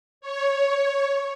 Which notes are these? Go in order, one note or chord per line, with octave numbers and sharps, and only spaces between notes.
C#5